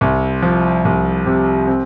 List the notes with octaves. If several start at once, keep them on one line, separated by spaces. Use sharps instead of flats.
C2
F3
C2
C3
C4